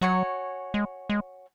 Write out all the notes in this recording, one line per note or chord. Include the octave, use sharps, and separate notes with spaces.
F#3 F#4 C#5 G#5
G#3
G#3